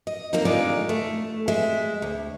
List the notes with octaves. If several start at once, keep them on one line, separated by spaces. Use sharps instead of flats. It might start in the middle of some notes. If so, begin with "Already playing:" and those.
D#5
D#2 A#3 C4 D#4
A2 D3 G#3 D#4 F4 D5
A3
G#3 E5
D2